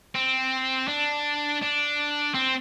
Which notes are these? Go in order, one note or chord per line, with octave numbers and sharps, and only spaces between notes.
C4
D4
D4
C4